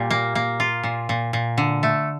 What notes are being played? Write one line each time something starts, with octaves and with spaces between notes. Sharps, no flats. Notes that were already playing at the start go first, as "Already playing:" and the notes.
Already playing: A#2 G3
A#3
A#3
F4
A#2
A#2
A#2
D3
A3